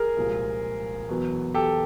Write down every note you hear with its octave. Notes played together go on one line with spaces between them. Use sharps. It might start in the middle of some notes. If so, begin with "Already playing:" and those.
Already playing: G#4 A#4
C2 A#2 F3 G#3
E2 B2 F#3
G4 A4